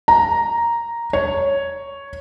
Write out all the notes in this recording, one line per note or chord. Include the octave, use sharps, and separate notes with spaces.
A#5
C#5